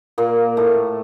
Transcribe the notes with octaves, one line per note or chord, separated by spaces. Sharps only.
A#2 A#3
A2 A3